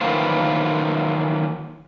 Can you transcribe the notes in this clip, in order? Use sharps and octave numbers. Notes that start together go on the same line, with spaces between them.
D#3 E3 F#3 A#3 F4 C5